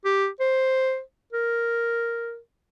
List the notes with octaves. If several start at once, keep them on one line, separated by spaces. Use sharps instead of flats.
G4
C5
A#4